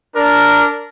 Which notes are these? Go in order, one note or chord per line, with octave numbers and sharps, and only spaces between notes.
D4 A#4